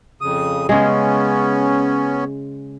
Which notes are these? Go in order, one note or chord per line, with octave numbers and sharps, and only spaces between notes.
F2 C#3 D#6
C#3 G#3 B3 C#4